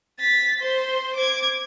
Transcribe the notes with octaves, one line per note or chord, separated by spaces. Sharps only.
A6 B6
C5 C6
D6 G#6